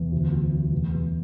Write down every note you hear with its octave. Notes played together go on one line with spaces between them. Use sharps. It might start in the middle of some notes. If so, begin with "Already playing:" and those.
Already playing: E2
D2
D2
F#3
E2
E2